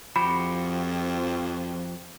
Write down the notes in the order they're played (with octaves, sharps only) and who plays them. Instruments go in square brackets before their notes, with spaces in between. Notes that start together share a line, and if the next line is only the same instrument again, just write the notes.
[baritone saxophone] F2 [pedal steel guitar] F3 F#4 G4 [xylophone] B5